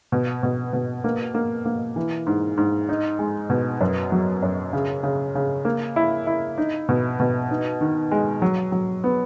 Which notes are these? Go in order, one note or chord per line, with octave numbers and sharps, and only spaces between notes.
B2
B2
B2
A#3
A#3
A#3
E3
G#2
G#2
D#4
G#3
B2
F#2
F#3
F#2
C#3
C#3
C#3
A#3
E4
E4
D#4
B2
B2
D#4
D#3
G#3
F#3
F#3
B3